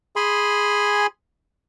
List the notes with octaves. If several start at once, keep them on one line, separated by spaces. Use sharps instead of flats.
G#4 G#5 B5 C6